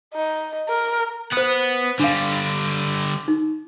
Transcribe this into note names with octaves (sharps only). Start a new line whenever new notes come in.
D#4
A#4
B3 C5 F#5 D#6
D3 G3 D4 F5
D#4